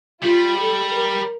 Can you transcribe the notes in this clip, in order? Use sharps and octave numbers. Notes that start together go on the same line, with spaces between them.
G3 F4
A4
A#4